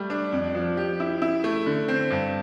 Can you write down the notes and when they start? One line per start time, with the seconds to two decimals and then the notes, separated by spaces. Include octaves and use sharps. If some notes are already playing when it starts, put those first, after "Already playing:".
Already playing: G3 A3
0.10 D4
0.32 F2
0.55 F3
0.77 G4
1.00 E4
1.22 E4
1.44 A3
1.66 D3
1.88 C4
2.10 G2